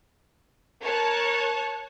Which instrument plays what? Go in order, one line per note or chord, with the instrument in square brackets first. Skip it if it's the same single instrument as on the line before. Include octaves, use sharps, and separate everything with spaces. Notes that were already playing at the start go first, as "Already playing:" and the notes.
[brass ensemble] A#4 [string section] C#5 A5 F#6